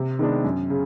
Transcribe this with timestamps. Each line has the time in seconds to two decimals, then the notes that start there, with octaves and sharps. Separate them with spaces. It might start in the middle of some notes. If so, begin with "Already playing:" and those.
Already playing: C3
0.19 D#3 G#3 B3 D4
0.44 F#2
0.70 C#3